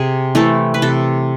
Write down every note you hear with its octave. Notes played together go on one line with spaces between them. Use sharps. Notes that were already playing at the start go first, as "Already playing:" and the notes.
Already playing: C3 G#4
E3 A3 C4 A4
B4
C3 A4